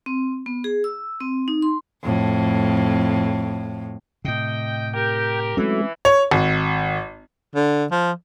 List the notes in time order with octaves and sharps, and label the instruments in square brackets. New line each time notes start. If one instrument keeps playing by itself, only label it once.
[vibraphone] C4
B3
G#4
E6
C4
D#4
C6
[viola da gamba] F2 A2
[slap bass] A2 C3 [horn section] D#5 G5
[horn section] G4 A#4 [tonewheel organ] G5
[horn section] E3 [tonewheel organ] F#3 A3 [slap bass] G#3 C4 C#4
[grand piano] C#5
G#1
[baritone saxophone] D3
F3